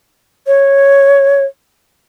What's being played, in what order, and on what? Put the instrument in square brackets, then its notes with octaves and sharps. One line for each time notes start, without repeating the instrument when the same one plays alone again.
[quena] C#5